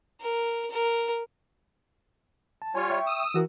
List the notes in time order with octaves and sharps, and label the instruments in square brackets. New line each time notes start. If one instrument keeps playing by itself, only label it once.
[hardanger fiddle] A#4
A#4
[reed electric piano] A5
[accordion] G3 F4 C#5 [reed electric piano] G#5
[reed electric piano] E5 G5 C#6
[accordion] D#6 E6
[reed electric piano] E3 F#4 A#4